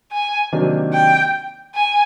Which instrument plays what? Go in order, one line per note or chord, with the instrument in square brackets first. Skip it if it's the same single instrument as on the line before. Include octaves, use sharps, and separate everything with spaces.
[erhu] G#5
[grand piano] C3 D#3 F#3 A#3 D4
[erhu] G5
G#5